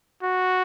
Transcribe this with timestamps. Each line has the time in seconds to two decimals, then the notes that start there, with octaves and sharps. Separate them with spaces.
0.23 F#4